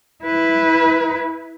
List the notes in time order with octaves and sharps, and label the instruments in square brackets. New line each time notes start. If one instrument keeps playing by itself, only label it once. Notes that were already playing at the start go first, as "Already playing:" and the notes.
[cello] E4 B4